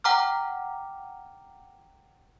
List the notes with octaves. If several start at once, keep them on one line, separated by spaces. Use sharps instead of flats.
F#5 G5 A#5 D6 F6